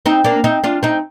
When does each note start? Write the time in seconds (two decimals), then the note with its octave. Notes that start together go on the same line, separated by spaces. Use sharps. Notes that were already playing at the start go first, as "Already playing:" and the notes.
0.06 C4 D#4
0.24 A#3 D4
0.44 C4 D#4
0.64 D4 F4
0.83 C4 D#4